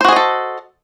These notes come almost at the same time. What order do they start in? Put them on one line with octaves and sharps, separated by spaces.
C5 F#4 G#4 D#5 A4